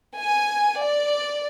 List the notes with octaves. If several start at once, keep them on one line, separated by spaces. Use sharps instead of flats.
G#5
D5